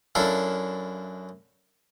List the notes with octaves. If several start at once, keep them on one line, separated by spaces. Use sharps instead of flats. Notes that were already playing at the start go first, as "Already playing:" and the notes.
F#2 D4 E4 A4 F5